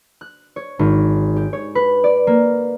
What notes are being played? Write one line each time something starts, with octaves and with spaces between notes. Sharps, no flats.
F#6
C#5
G#1
G4
C#5
B4
D5
A#3